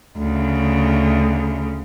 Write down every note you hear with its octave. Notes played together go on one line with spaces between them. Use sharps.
D2 C#3